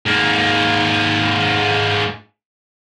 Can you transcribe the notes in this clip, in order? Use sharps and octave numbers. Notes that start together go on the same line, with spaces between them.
G#2 A#3